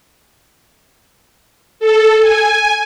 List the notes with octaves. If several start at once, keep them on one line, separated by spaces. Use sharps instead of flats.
A4
G#5